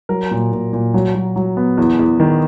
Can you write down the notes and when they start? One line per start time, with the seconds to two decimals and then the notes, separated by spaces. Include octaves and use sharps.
0.09 F#3 A#4
0.31 A#2
0.52 A#2
0.73 A#2
0.94 F#3
1.15 F#3
1.36 F#3
1.57 B3
1.77 E2
1.99 E2
2.20 D#3